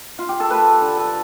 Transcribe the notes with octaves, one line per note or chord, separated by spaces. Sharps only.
F4
G4
A4
A3 B4
D3
A4